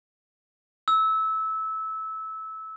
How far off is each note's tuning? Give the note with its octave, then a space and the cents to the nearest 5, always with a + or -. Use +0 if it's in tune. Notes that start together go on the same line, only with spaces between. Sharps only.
E6 -20